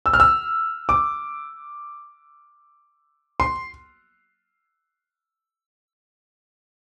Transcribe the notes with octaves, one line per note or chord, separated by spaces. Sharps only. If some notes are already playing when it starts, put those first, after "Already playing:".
E6
F6
E6
D6
C6